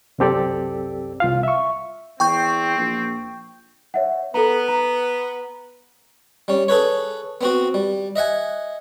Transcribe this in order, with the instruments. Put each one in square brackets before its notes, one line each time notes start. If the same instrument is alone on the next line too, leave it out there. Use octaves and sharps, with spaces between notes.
[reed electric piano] C2 F#2 C4 G4 A4 D5
C2 F4 F5
E5 C#6
[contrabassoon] E2 [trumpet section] C4 [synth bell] G5 C#6 G6
[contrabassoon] A#1
[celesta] C#5 E5 F#5
[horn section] B3 [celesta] A4 A#5
[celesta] A#5
[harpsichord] G3 C#4
G#4 A4 B4 C#5
B3 C4 F#4
G3
D#5 E5 F#5 G#5